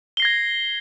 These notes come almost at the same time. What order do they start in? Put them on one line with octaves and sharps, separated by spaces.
G7 C7 A#6 G#6